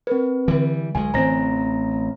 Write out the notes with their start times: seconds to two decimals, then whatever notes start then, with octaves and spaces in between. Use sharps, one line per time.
0.07 C4 A#4 B4
0.48 D3 E3 G3
0.95 B1 G#3 G#5
1.14 A1 E3 C4 C5 A#5 A#6